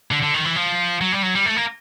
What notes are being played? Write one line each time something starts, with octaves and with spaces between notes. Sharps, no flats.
D3
D3
D#3
E3
F3
F#3
G3
F#3
G3
A3
A#3